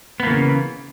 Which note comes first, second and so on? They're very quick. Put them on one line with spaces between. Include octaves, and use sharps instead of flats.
B3 A#3 E3 C#3